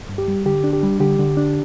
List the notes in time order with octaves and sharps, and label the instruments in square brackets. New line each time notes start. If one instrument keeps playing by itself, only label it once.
[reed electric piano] G2
G4
G3
D3 G4
D4
G4
G3
D3 G4
D3
D4